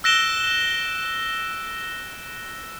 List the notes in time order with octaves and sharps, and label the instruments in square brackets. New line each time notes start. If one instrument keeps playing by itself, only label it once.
[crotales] E6 F#6 A#6 D7 E7 G7